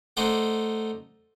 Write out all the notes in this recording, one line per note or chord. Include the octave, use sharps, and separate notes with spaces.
A3 D#4 C5 D5 F#5